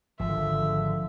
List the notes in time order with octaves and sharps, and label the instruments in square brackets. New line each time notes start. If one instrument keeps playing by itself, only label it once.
[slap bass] G#1 [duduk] D3 [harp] F3 [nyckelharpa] E5